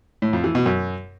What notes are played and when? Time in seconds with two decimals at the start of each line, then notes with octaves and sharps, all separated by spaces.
0.22 A2
0.33 F2
0.44 E3
0.55 B2
0.66 F#2